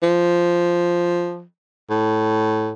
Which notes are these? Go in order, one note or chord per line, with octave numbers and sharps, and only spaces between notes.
F3
A2